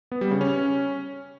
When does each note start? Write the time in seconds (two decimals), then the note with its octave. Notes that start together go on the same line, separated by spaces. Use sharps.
0.12 B3
0.21 G3
0.31 C#3
0.41 C#4